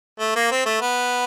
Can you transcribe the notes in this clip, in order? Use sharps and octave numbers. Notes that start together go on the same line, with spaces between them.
A3
A#3
C4
A3
B3